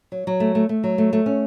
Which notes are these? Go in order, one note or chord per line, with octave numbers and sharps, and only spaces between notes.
F#3
F#3
A3
A3
A3
F#3
A3
A3
C#4